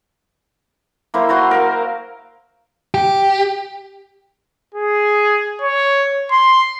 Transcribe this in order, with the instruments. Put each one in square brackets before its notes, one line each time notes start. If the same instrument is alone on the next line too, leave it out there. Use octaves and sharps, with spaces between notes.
[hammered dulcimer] A#3 E4 C5
F#4 C5 A#5 C6
A#4 F5
[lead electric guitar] G4
[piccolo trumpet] G#4
C#5
C6